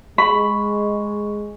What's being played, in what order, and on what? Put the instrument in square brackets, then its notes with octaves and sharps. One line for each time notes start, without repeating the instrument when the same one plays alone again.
[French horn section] G#3 [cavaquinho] B5 [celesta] C#6